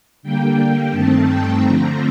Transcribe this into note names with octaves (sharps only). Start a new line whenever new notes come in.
D3 G3 A#3 G5
G2 D#3 A3 C4 A5
G5
D3 F3 A3 C4 A#5